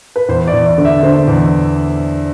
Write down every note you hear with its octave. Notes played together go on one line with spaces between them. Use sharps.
B4
E2 C5
D5
E2
D5
D3
E5
D3 C5
E2